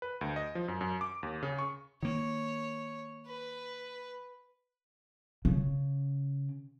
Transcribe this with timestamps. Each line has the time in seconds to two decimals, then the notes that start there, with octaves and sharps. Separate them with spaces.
0.02 B4
0.21 D2
0.36 D#5
0.55 F3
0.68 F#2
0.81 F#2
1.01 D6
1.23 D#2
1.43 C#3
1.59 C#6
2.03 D#3 A#3 C#5
3.26 B4
5.45 C#3